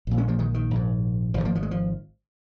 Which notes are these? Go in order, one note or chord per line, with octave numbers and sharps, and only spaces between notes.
A#1 A#2
G#3 C#4
F3 A#3
D#3 G#3
D#3
A#1 G#2
G#1 G#2 F3
F3 A#3
F3
G#3
F3